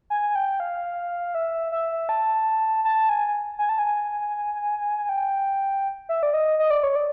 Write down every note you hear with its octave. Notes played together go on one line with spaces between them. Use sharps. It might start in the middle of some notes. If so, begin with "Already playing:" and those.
G#5
G5
F5
E5
E5
A5
A5
G#5
G#5
A5
G#5
G5
E5
D5
D#5
D#5
D5
C#5
D5